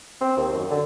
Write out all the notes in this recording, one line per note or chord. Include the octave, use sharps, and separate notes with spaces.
C4
D#2
F#2
D3